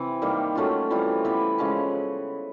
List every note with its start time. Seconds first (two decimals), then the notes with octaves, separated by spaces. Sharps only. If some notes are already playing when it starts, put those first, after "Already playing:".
Already playing: C3 E3 C4
0.22 D#3 G3 A#3
0.55 F#3 A3 C#4 F4
0.90 E3 G3 C4 F4
1.25 B3 E4 G4 B4
1.58 C#3 F3 G#3 C#4